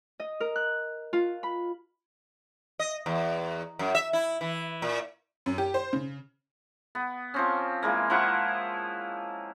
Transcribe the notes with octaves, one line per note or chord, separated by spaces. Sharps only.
D#5
A#4
F#6
F4
B5
D#5
E2
F#2
E5
E4
E3
A#2
F#2
G4
C5
C#3
B3
F3 C4 C#4
E3 G#3 A#3
F3 E4 F#5 C#6